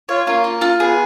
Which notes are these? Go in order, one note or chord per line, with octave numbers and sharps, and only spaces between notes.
F4 C#5
A#3 F4
F4
F4
B3 G#4